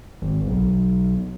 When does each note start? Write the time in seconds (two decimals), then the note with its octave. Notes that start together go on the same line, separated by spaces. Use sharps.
0.22 G#1
0.47 B1